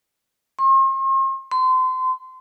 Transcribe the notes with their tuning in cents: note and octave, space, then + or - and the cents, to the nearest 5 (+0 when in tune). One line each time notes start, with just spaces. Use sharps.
C6 +45
C6 -30